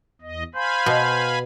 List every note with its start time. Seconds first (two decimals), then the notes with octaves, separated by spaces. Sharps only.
0.22 E2 D#5
0.55 C5 F5 G#5 B5
0.86 B2